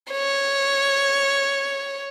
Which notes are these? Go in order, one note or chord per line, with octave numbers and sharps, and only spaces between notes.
C#5